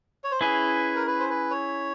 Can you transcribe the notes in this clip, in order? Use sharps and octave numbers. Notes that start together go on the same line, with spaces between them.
C#5
C5
C#4 E4 G#4 B4
A#4
B4
C5
B4
C#5